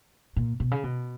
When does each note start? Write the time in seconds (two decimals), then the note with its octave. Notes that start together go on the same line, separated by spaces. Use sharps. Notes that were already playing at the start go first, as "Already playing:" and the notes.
0.36 A#2
0.60 B2
0.71 C#3
0.84 B2